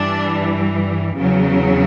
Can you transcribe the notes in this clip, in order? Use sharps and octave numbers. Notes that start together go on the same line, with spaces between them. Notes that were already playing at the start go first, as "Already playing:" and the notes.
Already playing: G2 E3 G3 D4
E2 C#3 F#3